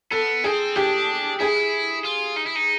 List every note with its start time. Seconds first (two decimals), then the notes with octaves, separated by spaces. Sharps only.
0.11 B3 A4
0.44 C4 G#4
0.76 D4 G4
1.40 E4 G#4
2.04 F4
2.36 D#4
2.46 E4
2.55 D#4